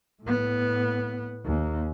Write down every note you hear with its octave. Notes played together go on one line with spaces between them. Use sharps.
A2 B3
D#2